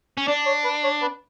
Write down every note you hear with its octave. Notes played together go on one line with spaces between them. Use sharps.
C#4
D4 D5
C#5
B4
C#5
B4